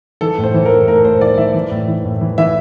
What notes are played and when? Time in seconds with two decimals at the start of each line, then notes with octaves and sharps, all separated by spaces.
0.21 E3 A4
0.38 A2
0.44 C5
0.54 E3
0.65 A#4
0.71 A2
0.88 A2 A#4
1.05 A2 C5
1.21 E3 D5
1.38 E3 E5
1.54 E3
1.71 A2
1.88 E3
2.04 A2
2.21 E3
2.38 E3 E5